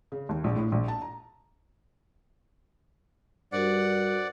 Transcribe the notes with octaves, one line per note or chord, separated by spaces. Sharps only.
C#3
D#2
A#1
A2
A#1
A5
A#5
G2 F#4 A#4 C5 D5 F#5